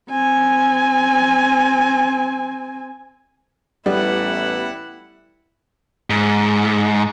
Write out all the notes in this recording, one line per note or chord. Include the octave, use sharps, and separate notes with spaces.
C4 G#5
A1 G3 B3 E4 F#5
G#2